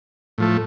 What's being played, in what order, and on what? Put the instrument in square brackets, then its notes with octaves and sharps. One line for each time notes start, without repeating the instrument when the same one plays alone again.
[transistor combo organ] A2 F3 A3